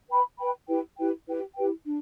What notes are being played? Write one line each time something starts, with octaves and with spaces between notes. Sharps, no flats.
B4 G5 B5
B4 G5 B5
E4 G4 B4 G5
E4 G4 B4 G5
E4 G4 B4 G5
E4 G4 B4 G5
D4